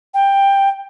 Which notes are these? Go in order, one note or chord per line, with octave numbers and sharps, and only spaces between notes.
G5